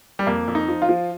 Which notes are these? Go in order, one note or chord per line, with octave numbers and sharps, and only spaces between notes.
G3
F2 A#3
F2
D#4
F3
F4
F3